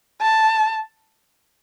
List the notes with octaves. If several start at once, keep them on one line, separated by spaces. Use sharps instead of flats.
A5